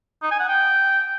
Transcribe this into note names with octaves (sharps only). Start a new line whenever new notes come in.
D#4
G#5
F#5
G5